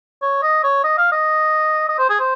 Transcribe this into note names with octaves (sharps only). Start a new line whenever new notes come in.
C#5
D#5
C#5
D#5
F5
D#5
D#5
C5
G#4
C5